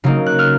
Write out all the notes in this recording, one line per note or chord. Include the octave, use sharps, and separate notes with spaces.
C#3 F#3 A#3 D#4
F#6
F6